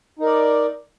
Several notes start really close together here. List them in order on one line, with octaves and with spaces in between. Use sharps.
D#4 A#4 D5